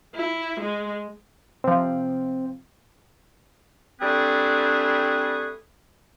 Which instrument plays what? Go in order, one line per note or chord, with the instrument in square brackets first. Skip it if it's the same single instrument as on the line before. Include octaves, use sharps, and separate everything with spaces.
[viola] E4
G#3
[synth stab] C3 F3 [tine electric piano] C4
[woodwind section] G3 A3 C4 D4 G#4 B4